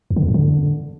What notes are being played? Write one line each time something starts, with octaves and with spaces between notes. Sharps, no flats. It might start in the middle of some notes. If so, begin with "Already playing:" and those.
E2
D3
E2
G#2
D3